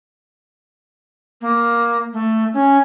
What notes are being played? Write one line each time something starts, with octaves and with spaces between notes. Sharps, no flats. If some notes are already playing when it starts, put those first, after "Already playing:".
A#3
A3
C#4